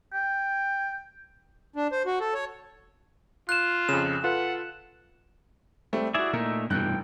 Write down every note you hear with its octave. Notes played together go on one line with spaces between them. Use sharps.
G5
D4
C5
F#4
A4
C#5
F4 F#6 E7
F2 C#3 E7
F4 A4 B4 F#5
G3 A3 C4
E4 F#4 G#4 D5 E5
A#2 A3 D#4 A#4 E5
F1 G2 B2 E3 G5 F#6